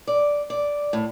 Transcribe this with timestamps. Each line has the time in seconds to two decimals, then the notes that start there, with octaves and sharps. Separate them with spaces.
0.07 D5
0.50 D5
0.93 A2